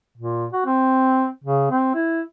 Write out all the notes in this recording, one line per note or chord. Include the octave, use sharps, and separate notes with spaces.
A#2
F#4
C4
C#3
C4
E4